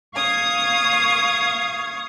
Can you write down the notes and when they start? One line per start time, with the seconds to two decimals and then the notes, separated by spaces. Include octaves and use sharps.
0.16 F5 C#6 D#6 G#6